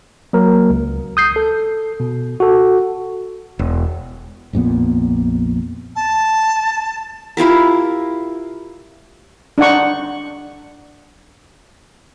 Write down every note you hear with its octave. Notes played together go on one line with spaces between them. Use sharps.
F#3 A#3 A#4
C#2
D#6 G6 C7
A4
B2
F#4 A4
E1
A#1 F2 A#2 B3
A5
E4 F4 G4 A#4
D4 D#4 F#5 C#6